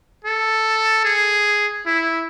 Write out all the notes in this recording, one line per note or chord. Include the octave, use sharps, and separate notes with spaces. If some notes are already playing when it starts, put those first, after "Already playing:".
A4
G#4
E4